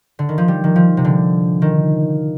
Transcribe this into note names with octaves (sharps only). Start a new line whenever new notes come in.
D3
D#3
F3
G3
D#3
F3
C3
D3
D#3